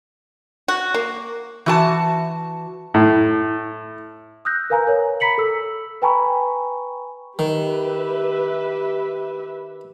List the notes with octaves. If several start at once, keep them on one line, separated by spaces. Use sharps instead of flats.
F#4
A#3
E3 F#4 A5
A2
D#6 E6 F#6 G6 A#6
A#4 B4 F5 G#5 A#5
A#4 C#5
A#5 B5 B6 C#7 F#7
A4 E6
B4 G5 G#5 A#5 B5 C#6
D#3 G4 B4 E5